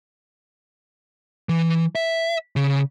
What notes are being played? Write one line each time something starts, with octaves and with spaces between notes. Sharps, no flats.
E3
E5
C#3